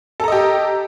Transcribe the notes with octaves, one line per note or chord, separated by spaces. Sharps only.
G4 A4 D#5 A#5